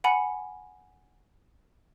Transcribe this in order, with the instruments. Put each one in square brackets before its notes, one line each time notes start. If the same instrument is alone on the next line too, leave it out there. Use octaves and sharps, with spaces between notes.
[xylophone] F#5 G#5 B5 C#7